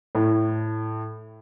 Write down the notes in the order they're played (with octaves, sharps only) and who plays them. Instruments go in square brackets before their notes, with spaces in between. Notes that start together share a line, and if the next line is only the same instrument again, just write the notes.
[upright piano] A2